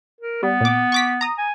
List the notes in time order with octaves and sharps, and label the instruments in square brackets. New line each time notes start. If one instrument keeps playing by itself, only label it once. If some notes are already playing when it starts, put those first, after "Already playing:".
[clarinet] A#4
[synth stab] G3 [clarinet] B3
[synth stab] A#2 D6
C#6 D6 B6
A#5 D#6
[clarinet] G#5